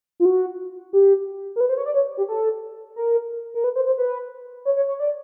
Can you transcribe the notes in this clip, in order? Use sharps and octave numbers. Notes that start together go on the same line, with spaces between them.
F4
F#4
G4
A#4
B4
C5
C#5
D5
C#5
G4
A4
A#4
A#4
B4
C5
C5
B4
C#5
C#5
C#5
D5